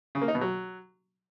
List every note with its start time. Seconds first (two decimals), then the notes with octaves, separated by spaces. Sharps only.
0.15 C#3
0.22 A#3
0.28 D#4
0.35 B2
0.41 F#3